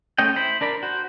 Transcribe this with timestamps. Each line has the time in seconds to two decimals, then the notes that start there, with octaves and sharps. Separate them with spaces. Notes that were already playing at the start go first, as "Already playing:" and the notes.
0.18 G#3 A3 C#4 D#5 G5
0.36 E4 C5 B5
0.61 D4 A#4 D5 B5
0.83 F#4 C5